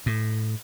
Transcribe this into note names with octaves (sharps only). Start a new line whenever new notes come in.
A2